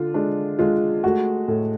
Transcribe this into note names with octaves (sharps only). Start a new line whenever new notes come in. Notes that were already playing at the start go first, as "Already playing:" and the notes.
Already playing: D3 D4 F4
G#3 D4
G#3 F4
A3 F#4
A2